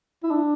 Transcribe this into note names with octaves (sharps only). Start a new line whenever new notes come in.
E4
D4